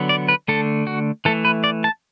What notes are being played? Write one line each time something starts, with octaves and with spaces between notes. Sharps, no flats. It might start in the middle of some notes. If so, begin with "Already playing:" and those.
Already playing: D3 F#3 B3
D5
B4
D3 A3 A4
F#4
E3 A3 A4
B4
D5
A5